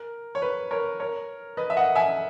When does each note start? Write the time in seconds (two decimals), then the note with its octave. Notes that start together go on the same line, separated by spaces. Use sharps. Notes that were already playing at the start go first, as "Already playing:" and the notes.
Already playing: A#4
0.35 C#5
0.42 B4
0.71 A#4 C#5
1.00 A#4 C#5
1.57 B4 D#5
1.70 E5
1.77 D#5 F#5
1.96 E5 G#5